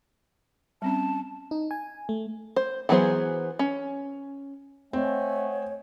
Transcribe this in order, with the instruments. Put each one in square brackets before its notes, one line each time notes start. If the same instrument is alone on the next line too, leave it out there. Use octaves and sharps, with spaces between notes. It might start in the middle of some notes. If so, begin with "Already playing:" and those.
[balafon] G3 C4 C#4 [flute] A5
[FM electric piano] D#4
G#5
A3
[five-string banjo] C5
E3 F#3 B3 G#4 C5
C#4
[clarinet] A3 [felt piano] C4 [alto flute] C#5 [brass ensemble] D#5 F#5 G#5